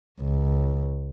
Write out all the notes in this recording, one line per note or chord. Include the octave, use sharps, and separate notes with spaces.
C#2